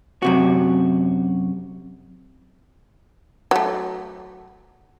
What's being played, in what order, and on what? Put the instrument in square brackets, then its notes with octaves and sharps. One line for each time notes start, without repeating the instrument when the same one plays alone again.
[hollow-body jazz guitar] F#2 C3 F#4
[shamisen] F#3 A3